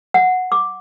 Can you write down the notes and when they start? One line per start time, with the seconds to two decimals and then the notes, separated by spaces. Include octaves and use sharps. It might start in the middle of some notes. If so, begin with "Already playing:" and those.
0.14 F#5
0.52 D6